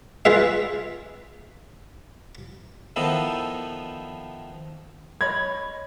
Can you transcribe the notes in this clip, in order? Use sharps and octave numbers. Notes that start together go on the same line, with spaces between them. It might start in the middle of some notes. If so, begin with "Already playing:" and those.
F4 G#4 B4 E5
D#3 F3 B3 D#4 E4 A4
C#5 D#5 B5 G#6